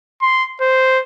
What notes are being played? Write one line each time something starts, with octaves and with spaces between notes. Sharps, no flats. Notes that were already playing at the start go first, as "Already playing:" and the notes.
C6
C5